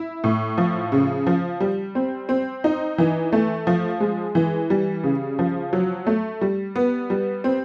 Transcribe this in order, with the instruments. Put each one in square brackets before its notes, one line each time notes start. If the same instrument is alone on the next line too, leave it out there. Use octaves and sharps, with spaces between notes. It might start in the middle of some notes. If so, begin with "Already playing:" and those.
Already playing: [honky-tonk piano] E4
A2
F3
C#3
F3
G3
C4
C4
D#4
E3
A3
F3
G#3
E3
G3
C#3
F3
F#3
A3
G3
B3
G3
C4